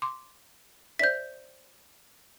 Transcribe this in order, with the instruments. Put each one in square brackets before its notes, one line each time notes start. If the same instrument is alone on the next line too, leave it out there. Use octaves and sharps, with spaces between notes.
[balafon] C6 D6
[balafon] C5 D5 E5 [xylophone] G6 B6